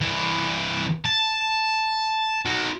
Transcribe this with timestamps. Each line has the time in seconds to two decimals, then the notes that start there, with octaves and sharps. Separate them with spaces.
0.01 C2 E3
1.05 A5
2.45 D#4 F#4